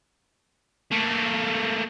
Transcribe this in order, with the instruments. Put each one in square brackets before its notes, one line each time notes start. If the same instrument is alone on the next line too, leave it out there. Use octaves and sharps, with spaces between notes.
[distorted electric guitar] A3 A#3